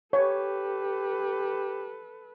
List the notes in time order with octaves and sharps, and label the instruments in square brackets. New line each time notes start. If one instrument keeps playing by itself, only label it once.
[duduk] G4 [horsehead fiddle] A4 B4 [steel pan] C#5